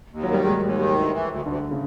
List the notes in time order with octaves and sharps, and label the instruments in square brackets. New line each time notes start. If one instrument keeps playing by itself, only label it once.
[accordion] D#2
[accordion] D#3 [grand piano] F#3
[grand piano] G3
[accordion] D#2 [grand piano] G#3
[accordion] D#2
D#3
D2
E3
D2
[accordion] D2 [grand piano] D3
[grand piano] C#3